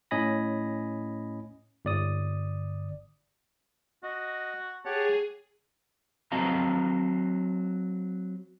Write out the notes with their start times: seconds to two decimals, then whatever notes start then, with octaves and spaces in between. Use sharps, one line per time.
0.11 A2 C#4 D#5 G#5 B5 A#6
1.85 G1 D5 D#6
4.03 F#4 D#5
4.85 G4 G#4 C#5 F#5 A5
6.32 F#3 C4 D#5 F5 A5 A#5